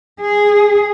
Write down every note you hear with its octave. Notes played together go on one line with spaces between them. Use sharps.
G#4